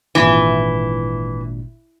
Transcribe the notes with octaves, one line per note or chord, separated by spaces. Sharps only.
G#1 A#2 E3 D4